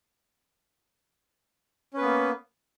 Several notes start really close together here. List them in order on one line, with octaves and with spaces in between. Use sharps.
C#4 B4 B3 A#3